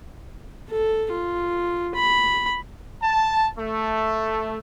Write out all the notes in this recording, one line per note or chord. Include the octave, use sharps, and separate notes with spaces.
A4
F4
B5
A5
A3